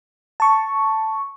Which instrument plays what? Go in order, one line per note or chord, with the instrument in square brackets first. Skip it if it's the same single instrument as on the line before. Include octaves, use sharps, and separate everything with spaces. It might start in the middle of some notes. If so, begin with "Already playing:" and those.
[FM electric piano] A5 C#6